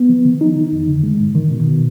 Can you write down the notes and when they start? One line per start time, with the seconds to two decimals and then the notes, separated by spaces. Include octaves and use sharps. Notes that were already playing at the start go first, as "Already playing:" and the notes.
Already playing: B3
0.09 F3
0.25 D#3
0.41 D#4
0.56 D#3
0.72 F2
0.88 D3
1.03 G#3
1.20 G#2
1.35 D#3
1.51 B2
1.67 B2